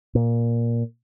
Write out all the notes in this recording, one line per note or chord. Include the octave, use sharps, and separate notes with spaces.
A#2